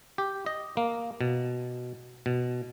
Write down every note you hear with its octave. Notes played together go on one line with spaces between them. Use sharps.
G4
D#5
A#3
B2
B2